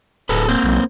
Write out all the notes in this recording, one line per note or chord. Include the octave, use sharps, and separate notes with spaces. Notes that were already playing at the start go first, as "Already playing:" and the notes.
D1 G#4 A4 B4
A#3 C4 C5
B1